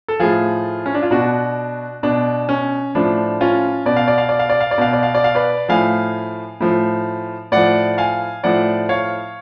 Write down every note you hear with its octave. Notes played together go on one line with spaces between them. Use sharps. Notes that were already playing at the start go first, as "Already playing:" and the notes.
A4
A2 F3 F4 G#4
C#4
D4
F4
B2 D4 F#4
B2 D4
C#4
A2 F3 D4
C#4 F4
B2 D5
F5
D5
F5
D5
F5
D5
F5
D5
B2 F5
D5
F5
D5
F5
B4 D5
A2 F3 F5 G#5
A2 F3
A2 F3 D5 F#5
F5 G#5
A2 F3 D5 F#5
C#5 F5